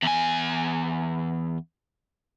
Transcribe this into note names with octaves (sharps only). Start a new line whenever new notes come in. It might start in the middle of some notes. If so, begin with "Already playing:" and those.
E2 G#5